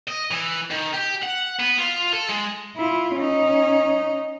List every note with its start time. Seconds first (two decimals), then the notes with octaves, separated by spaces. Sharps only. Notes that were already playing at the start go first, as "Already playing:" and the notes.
0.07 D#5
0.31 E3
0.70 D#3
0.93 G4
1.22 F#5
1.59 B3
1.78 F4
2.13 A4
2.29 G#3
2.77 E4 F4
3.15 C#4 D#4